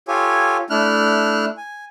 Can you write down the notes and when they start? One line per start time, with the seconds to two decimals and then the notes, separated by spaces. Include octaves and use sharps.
0.08 F4 G4 A4 C#5 G#5
0.70 A3 D4 E4 F6 F#6
1.57 G#5